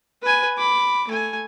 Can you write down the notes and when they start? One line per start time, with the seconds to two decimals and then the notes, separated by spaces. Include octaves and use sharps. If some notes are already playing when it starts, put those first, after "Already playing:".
0.23 B4 G#5
0.57 B5 D6
1.08 A3 G#5